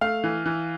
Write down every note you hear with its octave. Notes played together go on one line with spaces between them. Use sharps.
A3 F5
E3
E3